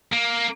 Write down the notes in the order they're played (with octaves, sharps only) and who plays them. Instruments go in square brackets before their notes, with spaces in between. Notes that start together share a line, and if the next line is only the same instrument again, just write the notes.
[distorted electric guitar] A#3